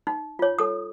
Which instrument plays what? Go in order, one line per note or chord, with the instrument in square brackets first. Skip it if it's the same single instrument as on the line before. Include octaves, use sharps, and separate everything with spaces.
[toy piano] D#4
F4 C#5
A4 D#6